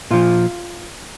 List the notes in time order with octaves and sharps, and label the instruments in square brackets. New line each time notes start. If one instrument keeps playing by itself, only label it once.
[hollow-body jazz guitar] A#2 F3 F4